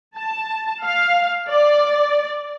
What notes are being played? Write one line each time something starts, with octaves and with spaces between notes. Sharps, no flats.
A5
F5
D5